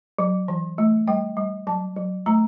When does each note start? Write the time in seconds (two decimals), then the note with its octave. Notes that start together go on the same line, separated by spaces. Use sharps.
0.19 F#3
0.48 E3
0.78 A3
1.08 G3 G5
1.37 G3
1.67 F#3 A5
1.96 F#3
2.26 A3 A#5